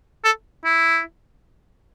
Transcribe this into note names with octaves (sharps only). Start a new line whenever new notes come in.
A4
E4